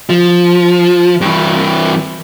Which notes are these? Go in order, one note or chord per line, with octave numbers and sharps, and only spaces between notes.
F3
G2 E3